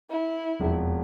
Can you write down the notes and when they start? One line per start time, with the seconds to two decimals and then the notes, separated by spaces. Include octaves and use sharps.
0.10 E4
0.60 E1 F2